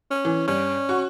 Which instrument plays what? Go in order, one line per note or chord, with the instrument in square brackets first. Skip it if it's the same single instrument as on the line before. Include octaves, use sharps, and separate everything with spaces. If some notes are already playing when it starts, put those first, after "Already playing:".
[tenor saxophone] C#4
[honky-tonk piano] E3
[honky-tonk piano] G2 [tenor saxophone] C#4
[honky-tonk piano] F#4 C#6